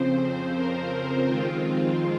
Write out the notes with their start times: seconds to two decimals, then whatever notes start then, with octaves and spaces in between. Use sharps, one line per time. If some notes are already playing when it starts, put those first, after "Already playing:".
Already playing: F2 C#3 F3 C4 C5
0.54 A#4
1.25 F2 D#3 G#3 C4 F4